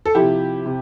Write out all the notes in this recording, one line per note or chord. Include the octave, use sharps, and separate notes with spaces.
A4
C3 F3 E4 G4
C3